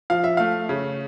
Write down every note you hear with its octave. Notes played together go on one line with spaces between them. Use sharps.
F3 F5
E5
A3 F5
C#3